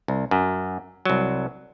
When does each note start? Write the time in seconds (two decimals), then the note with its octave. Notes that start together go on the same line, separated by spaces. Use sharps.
0.08 C2
0.31 F#2
1.05 C2 F#3